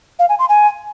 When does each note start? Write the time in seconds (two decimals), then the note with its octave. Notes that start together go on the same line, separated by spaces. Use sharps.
0.19 F5
0.29 G#5
0.39 C6
0.49 G#5